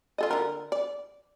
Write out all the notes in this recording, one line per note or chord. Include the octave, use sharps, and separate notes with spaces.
F4 A4 D#5
D3 A#4
D5